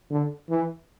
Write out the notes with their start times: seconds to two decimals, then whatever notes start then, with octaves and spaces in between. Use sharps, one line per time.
0.10 D3
0.49 E3